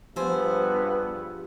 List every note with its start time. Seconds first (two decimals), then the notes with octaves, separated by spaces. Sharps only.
0.16 G2 F3 B3 G4 G#4 C5 E6